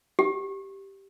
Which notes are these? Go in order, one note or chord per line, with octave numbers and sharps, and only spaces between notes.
G4